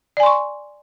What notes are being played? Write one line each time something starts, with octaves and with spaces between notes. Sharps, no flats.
D5 G#5 C6 C#6